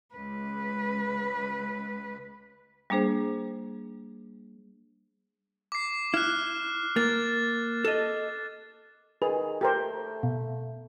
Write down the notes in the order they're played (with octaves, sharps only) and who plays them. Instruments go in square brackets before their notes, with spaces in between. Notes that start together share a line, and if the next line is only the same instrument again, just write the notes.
[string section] C#2 [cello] B4
[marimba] G3 A#3 D4 G#4 C5
[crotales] D6 C7
[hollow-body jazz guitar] E4 [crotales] F6 F#6
[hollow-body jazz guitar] A#3 [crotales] A6
[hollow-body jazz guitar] A4 D#5
[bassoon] D#3 [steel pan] G#4 [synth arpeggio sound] B4
[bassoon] A3 [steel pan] G4 A#4 C5
[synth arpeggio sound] B2